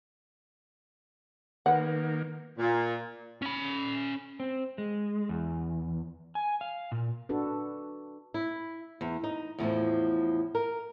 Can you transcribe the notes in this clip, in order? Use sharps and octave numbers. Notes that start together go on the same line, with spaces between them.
D#3 A#3 B4 F#5
A#2
C#4 B5
C4
G#3
E2
G#5
F5
A#2
D4 F#4 A4 B4
E4
E2
D#4
E2 A2 D3 F3
A#4